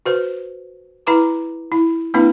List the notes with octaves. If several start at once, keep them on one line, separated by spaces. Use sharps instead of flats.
F#4 B4 C5
E4 B4 A#5 D6
E4
A#3 C4 D4 E4 B4